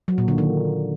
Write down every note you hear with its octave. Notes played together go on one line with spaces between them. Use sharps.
F#3
A#2
D3
D#3